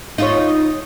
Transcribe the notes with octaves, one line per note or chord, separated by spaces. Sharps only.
D#4 F4 C#5